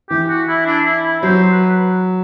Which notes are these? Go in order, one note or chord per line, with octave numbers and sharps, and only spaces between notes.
E3 G4
F#4
E4
D4
E4
E4
F#3 C5
B4